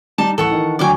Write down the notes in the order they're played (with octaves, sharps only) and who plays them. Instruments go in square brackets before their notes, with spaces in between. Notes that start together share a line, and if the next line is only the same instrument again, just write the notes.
[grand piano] G3 [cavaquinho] D#4 D5 A5
[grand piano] A1 [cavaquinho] A4 F#5 C#6
[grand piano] D#3 E3
[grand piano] D2 F#3 C#6 [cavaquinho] D5 G5 G#5